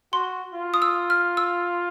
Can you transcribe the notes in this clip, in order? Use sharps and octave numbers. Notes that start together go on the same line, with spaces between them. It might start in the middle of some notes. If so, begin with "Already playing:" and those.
F#4 C6
F4
D#6
E6
F6
E6